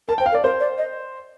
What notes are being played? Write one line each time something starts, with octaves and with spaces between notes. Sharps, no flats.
A#4 A5
C5 G5
F5
A#4
D5
A#4 C5
D5
D#5